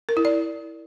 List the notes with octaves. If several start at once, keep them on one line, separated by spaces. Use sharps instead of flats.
A#4
E4
D5